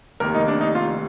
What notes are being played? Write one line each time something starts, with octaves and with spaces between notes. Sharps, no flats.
F1 D#2 D#3 A#4
D#4
D4
D#4
F4